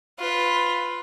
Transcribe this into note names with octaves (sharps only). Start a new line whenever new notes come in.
F4 B4